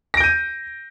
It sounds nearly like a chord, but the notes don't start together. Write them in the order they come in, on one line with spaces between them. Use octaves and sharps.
A#6 D7 G6 D#7